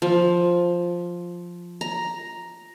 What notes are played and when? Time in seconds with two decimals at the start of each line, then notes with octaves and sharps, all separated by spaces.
0.02 F3
1.81 A#5